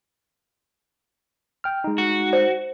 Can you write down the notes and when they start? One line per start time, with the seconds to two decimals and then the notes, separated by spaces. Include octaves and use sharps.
1.64 G5 F6
1.84 G#3 D#4
1.98 F#4
2.33 C5